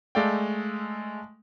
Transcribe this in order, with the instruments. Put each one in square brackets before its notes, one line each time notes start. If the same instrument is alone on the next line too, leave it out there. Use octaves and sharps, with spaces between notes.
[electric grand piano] G#3 A3 A4 D5 F5 G5